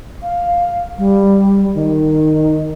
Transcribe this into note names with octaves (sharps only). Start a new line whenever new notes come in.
F5
G3
D#3